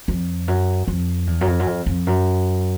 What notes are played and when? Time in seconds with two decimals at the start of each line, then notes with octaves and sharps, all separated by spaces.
0.08 F2
0.48 F#2
0.88 F2
1.27 E2
1.41 F#2
1.47 F2
1.59 F#2
1.67 F2
1.86 F2
2.07 F#2